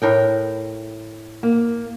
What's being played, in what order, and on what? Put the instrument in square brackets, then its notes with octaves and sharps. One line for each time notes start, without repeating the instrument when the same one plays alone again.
[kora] A2 A#4 G5
[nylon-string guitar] A#3